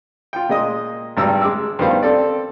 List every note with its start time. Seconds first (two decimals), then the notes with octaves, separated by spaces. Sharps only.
0.33 F4 G5
0.49 A#2 G#3 D#5 D#6
1.17 G#1 G2 G3 A#5 E6
1.41 G#3 D6 E6
1.79 G2 D#3 F3 B3 C5 F5
2.03 C4 A4 D5